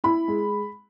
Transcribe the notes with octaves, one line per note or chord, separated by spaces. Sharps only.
E4 B5
G#3